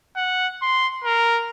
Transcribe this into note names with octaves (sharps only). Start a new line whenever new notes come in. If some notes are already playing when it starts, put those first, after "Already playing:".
F#5
C6
A#4